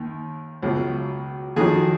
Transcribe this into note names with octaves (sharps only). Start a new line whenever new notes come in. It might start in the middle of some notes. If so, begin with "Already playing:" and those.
Already playing: D#2 D#3
C#2 B2 F#3
F2 D#3 F#3 G#4